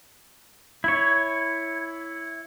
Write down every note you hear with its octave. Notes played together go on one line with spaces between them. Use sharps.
E4 C#5